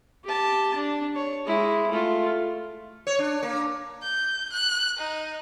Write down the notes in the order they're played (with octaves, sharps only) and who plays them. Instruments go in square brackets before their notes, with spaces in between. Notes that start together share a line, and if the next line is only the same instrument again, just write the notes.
[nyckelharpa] G4 A5
D4
C#5
G#3 E4
A3 F4
[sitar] C#5
D4
A#3
[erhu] G6
F#6
D#4